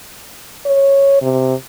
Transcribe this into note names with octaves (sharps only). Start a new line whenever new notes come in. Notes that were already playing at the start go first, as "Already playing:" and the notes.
C#5
C3